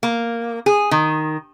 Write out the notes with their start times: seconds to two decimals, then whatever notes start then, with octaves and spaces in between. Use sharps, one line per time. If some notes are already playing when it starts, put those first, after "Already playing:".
0.03 A#3
0.66 G#4
0.91 D#3